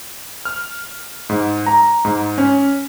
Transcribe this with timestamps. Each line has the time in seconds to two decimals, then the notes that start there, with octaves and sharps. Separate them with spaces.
0.45 F6
1.29 G#2
1.66 A#5
2.05 G#2
2.38 C#4